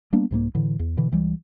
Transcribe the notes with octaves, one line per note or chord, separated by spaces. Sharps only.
G3 A#3 B3 D4
C2 G#2 G#3 A#3
A2 D3 E3
E2
B2 D3 E3
C#2 E3 G3